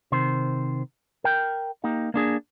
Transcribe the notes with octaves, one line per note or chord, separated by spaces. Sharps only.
C3 D#3 C5
A#4 G5
A#3 D#4 G4
A#3 D4 G#4